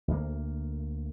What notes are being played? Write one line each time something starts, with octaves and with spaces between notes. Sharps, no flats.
D2 A#3